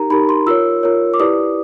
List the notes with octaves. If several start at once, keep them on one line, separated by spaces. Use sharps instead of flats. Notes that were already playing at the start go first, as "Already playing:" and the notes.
Already playing: D#4 G4 A#4 A#5
D#4 G4 A#4 B5
C6
F4 A#4 C#5 E6
F4 A#4 C#5
D6
E4 G4 B4 D5 D#6